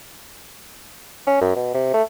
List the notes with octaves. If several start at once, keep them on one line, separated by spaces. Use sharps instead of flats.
C#4
F#2
B2
C3
A3